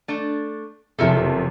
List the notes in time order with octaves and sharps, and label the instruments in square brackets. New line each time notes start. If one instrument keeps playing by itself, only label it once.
[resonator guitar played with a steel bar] A3 D4
[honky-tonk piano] F#1 F2 C3 [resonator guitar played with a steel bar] A4 A#4 E5